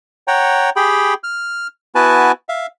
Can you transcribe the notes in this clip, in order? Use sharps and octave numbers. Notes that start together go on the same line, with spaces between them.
C#5 F#5 G5 A#5
G4 G#4 G5 B5
F6
B3 E4 F#4 B4 G#5 A5
E5 F5